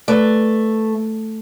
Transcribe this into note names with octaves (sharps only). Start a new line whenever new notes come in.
A3 B4 D5